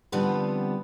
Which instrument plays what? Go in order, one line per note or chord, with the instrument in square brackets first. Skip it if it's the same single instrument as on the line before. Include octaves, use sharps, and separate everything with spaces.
[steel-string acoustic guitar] D3 F3 G3 B3 C4 B4